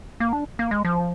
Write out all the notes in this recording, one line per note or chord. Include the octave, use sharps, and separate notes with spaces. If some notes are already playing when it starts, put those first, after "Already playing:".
A#3
D4
A#3
G#3
F3